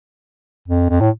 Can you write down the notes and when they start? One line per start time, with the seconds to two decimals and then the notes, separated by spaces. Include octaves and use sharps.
0.68 F2
0.90 F2
1.01 A2